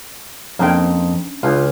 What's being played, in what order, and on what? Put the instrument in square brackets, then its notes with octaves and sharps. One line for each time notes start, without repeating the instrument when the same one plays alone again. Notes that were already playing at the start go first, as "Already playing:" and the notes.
[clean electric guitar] F2 [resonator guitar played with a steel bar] A#3 C5 G5 [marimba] C#4 D4
[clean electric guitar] C#2 [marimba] D4 [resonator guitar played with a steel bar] F4